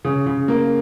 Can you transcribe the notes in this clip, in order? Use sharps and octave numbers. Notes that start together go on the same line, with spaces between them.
C#3
C#3
A#3